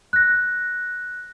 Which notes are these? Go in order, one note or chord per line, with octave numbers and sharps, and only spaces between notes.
F#6 A#6